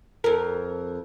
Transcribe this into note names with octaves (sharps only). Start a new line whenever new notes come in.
F2 A#4